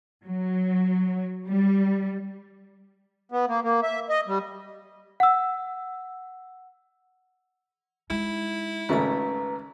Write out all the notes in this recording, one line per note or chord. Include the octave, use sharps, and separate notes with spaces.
F#3
G3
B3
A#3
A#3
E5
D#5
G3
F#5 E6
G#3 D#4 E4
G#1 C#3 A3 B4 A#5